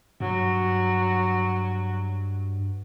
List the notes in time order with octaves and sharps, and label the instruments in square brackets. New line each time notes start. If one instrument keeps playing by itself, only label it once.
[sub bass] G2 [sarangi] F#3